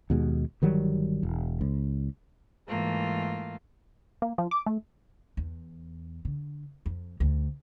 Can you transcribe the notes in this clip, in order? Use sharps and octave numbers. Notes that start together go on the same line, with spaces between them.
D#2 B2 G#3
G1 D#3 F#3 G3
E1
C#2
G#2 E3 A3 A#3 F4
A#3
F3
D6
A3
E2
D3
F2
D2